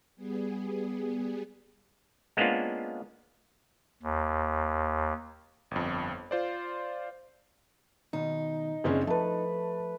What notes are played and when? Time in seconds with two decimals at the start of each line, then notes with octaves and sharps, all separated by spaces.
0.16 G3 B3 G#4
2.37 G#3 A#3 B3 C#4 D4 F4
4.03 D#2
5.71 G1 F2
6.31 F4 C5 D5
8.13 B2 D#3 D#4
8.84 F#1 C4 C#4 G#4 D5 E5
9.07 F3 A3 B4 A5